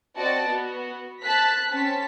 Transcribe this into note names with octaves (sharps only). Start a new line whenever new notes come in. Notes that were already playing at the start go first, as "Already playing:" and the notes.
C4 F#4 D5 D#5 A5
B3 F#4
C5 A5 F#6 B6
C4 C#4 A5 B6